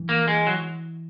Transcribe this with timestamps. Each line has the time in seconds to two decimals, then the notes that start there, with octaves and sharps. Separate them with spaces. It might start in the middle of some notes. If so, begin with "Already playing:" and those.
Already playing: E3
0.09 A#3
0.28 G#3
0.47 F#3